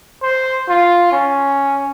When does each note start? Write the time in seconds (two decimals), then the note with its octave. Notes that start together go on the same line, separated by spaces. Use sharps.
0.23 C5
0.69 F4
1.12 C#4